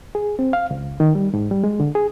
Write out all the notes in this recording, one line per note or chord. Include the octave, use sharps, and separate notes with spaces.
G#4
C4
F5
C#2
D#3
G3
G#2
G3
G#3
D3
G#4